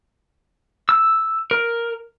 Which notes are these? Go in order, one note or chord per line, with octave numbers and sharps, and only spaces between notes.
E6
A#4